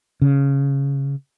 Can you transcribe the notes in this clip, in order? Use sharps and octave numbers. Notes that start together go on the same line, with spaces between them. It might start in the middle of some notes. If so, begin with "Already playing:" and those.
C#3